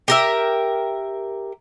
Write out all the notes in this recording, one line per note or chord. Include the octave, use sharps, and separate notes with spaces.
G4 A#4 E5